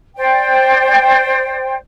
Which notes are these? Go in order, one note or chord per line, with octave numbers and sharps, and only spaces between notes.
C5 D5 G5